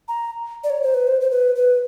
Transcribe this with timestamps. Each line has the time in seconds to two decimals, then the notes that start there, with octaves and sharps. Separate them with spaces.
0.08 A#5
0.64 D5
0.70 C#5
0.83 C5
0.94 B4
1.07 C5
1.21 C5
1.31 B4
1.56 B4